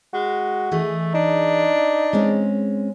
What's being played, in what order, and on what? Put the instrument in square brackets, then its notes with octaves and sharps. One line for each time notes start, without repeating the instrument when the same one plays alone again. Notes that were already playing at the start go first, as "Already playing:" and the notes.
[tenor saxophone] G#3 [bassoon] F#4
[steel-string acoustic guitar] E3 G#4 D#5 [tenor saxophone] A3
[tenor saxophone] D4 [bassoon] D#4
[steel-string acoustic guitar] G#3 C4 C#4